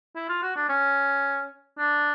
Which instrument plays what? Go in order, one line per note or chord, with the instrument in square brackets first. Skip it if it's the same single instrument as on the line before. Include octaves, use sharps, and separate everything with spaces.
[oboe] E4
F4
F#4
D4
C#4
D4